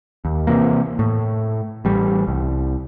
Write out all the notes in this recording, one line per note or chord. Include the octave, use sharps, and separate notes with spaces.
D#2
C3 E3 A#3
A2
A1 G3
C2